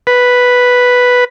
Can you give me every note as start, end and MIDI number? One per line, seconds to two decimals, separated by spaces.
0.07 1.24 71